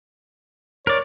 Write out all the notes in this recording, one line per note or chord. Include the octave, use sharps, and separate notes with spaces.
A#4 C#5 D5